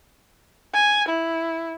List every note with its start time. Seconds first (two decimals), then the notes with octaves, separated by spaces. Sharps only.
0.74 G#5
1.09 E4